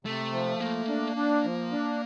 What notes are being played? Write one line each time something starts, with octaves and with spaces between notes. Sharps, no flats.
C3 A3
F3
A3 A#3
D4
D4
F3
D4